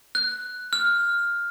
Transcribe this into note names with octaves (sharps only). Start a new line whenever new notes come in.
F#6
F6